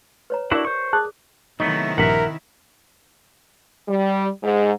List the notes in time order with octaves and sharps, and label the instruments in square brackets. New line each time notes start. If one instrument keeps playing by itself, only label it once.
[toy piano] B4 C#5 A#5
[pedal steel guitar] D4 E4 F#4 [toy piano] G4 A#4 D5
[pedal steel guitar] C5 C#6
[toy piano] G#4 D#6 [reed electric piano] A5 F#6
[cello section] C3 D#3 E4 [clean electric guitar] F#3 A3 B3 [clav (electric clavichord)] D#4
[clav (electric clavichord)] A#1 G2 [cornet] A#4 [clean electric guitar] E5 F#5
[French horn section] G3
G#2